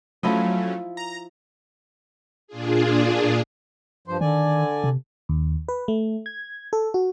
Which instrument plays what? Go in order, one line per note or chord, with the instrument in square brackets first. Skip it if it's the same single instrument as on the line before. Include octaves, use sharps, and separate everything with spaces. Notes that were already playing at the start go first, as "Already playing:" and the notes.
[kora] F3 E4 D#5 [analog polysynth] F#3 A3 C#4
[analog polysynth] A#5
[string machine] A#2 D4 F4 G#4
[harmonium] G2 F3 C5
[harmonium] D3 D5 G#5 [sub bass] D#3
[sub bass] C3
[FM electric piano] D#2
B4
A3
G#6
A4
F#4